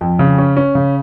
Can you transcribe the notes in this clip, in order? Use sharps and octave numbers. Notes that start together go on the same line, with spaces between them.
F2
C#3
C#4
C#4
C#3